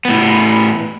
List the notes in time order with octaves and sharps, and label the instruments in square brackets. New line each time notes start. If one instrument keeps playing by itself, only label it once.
[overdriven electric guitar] A2 B3